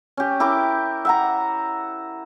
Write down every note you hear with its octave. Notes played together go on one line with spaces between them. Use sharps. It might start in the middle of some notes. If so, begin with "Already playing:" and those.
C#4 G4
E4 G4 A#4 D6
E5 F#5 A#5